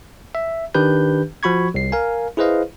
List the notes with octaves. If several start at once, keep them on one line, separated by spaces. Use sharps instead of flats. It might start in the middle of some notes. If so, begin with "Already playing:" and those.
E5
D#3 D4 G4 B4 G6
F3 F#4 B5 C#6 G#6
C2 C7
A#4 F5 G#5
E4 G#4 B4 C5 D#5 F5